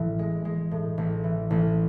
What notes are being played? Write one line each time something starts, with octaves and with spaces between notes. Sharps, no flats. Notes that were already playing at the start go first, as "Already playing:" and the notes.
Already playing: A1 A2 E3
G#3
G#3
A2
A1
E3
A1